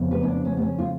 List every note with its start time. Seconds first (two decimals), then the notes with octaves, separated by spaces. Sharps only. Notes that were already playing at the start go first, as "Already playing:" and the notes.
Already playing: F2 C#3 B3
0.11 B4
0.23 C#4
0.27 D4
0.45 C#4
0.57 B3
0.62 C#4
0.79 F4